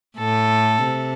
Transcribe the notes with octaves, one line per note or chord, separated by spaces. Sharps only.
A2 A4
C3